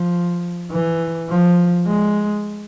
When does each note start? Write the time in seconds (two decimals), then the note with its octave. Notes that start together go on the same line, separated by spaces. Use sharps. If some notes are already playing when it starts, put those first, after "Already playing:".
Already playing: F3
0.71 E3
1.29 F3
1.87 G#3